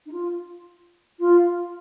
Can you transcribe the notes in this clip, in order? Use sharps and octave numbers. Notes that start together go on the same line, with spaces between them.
D#4
F4
F4